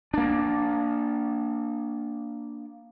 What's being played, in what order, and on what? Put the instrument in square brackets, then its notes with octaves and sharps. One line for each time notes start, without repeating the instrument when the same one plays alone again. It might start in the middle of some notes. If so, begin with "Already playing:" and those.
[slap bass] A#3 D4